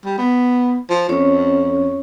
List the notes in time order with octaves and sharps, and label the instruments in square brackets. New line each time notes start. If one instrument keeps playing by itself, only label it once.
[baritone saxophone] G3
B3
F3
[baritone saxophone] F2 [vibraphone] C#4 C#5